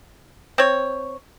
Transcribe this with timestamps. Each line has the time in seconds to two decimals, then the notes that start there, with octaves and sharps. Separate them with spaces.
0.58 C4 C#5